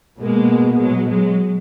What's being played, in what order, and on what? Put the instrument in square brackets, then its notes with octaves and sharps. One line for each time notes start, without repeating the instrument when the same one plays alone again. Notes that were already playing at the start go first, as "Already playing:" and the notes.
[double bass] B2 [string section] G#3 A#3
[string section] F#3 G#3
F#3 G#3